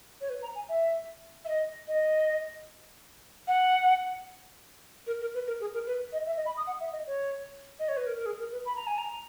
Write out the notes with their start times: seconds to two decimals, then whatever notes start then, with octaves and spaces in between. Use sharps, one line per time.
0.21 C#5
0.30 B4
0.42 A#5
0.55 G#5
0.69 E5
1.45 E5
1.49 D#5
1.88 D#5
3.48 F#5
5.07 A#4
5.21 A#4
5.34 B4
5.47 A#4
5.61 G#4
5.74 A#4
5.87 B4
6.13 D#5
6.26 E5
6.37 D#5
6.46 B5
6.57 D#6
6.67 F#5
6.80 E5
6.93 D#5
7.07 C#5
7.80 D#5
7.88 C#5
7.97 B4
8.06 A#4
8.17 A#4
8.26 G#4
8.39 A#4
8.52 B4
8.66 B5
8.76 A#5
8.87 G#5
8.98 A#5